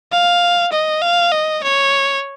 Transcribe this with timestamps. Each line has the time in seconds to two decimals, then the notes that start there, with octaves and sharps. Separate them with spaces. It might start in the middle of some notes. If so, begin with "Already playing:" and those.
0.12 F5
0.72 D#5
1.02 F5
1.32 D#5
1.63 C#5